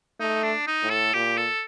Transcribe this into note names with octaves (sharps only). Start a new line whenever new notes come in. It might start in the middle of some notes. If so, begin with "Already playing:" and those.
A3 D#4
D4
D#4
A2
A4
A#2 G4
A4